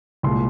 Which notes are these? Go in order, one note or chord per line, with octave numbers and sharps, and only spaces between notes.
C2 A#2 G#3 C6